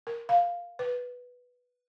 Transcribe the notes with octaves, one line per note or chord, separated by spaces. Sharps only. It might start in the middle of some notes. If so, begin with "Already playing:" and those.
A#4
F5
B4